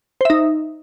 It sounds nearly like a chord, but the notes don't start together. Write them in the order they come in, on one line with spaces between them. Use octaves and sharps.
C5 E5 D#4